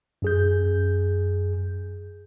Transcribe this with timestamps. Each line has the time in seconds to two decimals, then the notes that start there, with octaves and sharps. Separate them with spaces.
0.22 F#2 G#4 G6